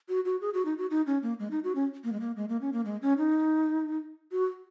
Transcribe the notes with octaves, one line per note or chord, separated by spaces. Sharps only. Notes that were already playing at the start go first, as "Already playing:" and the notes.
F#4
F#4
G#4
F#4
D#4
F#4
D#4
C#4
A#3
G#3
D#4
F#4
C#4
A#3
G#3
A#3
G#3
A#3
C#4
A#3
G#3
C#4
D#4
F#4